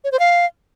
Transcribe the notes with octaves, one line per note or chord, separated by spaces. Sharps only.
C#5
C5
F5